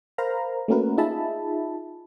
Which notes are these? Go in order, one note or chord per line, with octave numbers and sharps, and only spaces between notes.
A#4 C5 F5 A#5 B5
A3 A#3 C#4 F#4 A#4 B4
D#4 F4 G#4 E5 A5 B5